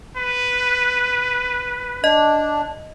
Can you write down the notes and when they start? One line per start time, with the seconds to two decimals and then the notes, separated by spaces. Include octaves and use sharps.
0.17 B4
2.04 D4 D#5